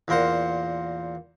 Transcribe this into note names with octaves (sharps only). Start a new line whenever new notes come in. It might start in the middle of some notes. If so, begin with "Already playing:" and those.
E2 A#2 A#4 C5 F#5